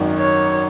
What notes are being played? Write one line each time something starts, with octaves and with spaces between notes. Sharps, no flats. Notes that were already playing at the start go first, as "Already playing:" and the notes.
Already playing: G#1 F#2 D#3
C#5